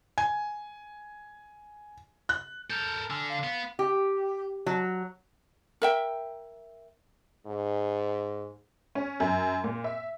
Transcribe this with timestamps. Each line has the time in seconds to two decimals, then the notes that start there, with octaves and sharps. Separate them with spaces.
0.18 G#5
2.29 F#6
2.70 A4 A#4 G6
3.10 D3 G#5 E6 F6
3.30 F5 C7
3.44 B3
3.79 G4
4.66 F#3
5.82 A#4 E5 G5
7.47 G#2
8.95 C#4
9.20 F#2
9.64 A#2
9.84 E5